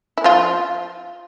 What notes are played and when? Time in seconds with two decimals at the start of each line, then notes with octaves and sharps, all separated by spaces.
0.18 E4
0.24 F3 F4